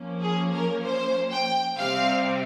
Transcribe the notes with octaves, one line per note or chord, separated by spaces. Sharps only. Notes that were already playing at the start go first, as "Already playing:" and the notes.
Already playing: F3 A#3 C#4
G#4
A#4
C5
G5
C3 G3 C4 F5